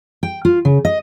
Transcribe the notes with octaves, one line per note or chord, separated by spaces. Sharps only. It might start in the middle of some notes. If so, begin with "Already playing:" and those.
G5
F4
C#3
D#5